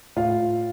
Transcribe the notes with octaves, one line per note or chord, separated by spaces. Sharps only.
A2 F4 F5